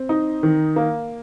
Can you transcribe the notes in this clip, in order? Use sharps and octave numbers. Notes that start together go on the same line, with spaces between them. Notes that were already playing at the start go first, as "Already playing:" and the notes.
Already playing: C4
D#4
D#3
A#3